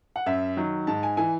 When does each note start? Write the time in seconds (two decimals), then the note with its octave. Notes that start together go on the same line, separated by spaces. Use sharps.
0.16 F#5
0.26 F#2 E5
0.57 D#3 F#3
0.87 G#2 A5
1.03 G#5
1.17 E3 G#5